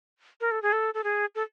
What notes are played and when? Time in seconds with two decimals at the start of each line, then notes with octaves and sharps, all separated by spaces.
0.41 A#4
0.51 A4
0.62 G#4
0.73 A4
0.94 A4
1.04 G#4
1.35 A4